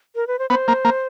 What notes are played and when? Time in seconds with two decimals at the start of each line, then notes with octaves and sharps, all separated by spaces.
0.16 A#4
0.27 B4
0.39 C5
0.50 B3 C5
0.68 A#3
0.85 A#3